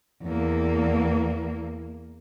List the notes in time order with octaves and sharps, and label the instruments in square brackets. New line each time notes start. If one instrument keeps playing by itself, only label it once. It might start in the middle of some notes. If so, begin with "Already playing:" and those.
[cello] E2 A#3